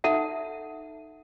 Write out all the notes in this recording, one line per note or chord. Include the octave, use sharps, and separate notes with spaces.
D#4 A4 E5 F#5